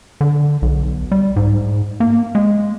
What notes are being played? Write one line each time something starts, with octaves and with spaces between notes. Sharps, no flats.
D3
B1
G3
G#2
A#3
G#3